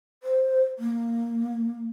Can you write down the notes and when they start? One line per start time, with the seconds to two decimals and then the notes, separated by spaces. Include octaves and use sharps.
0.23 C5
0.79 A#3